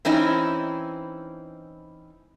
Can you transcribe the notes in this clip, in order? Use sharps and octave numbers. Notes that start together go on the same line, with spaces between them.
E3 C4 C#4 D#4 E4